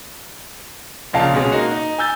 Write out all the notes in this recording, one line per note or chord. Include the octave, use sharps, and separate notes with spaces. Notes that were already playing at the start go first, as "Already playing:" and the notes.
A#1 A#2 C#3 D#5 F5 A5
B2 G#3 C#4
A#3 D#4 F#4
D#4
G#5 E6 G6 A6